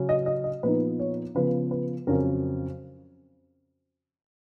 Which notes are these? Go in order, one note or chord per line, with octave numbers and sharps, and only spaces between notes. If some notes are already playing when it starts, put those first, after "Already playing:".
Already playing: C#3 F#3 C#4
D#5
D#5
D#5
A#2 F3 B3 D#4 B4
C#5
C#3 F3 B3 B4
B4
F2 C#3 F#3 C#4 A#4